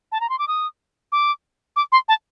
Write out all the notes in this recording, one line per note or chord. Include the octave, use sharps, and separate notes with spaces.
A5
A#5
C6
D6
D#6
D6
D6
C6
A5